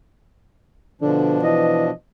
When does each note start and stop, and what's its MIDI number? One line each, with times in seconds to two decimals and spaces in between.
1.02 1.90 47
1.02 1.38 50
1.02 1.90 53
1.02 1.90 62
1.43 1.88 52
1.43 1.92 75